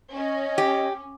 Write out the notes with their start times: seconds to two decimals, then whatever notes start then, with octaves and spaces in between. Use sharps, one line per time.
0.13 C#4 C#5 D#5
0.58 G4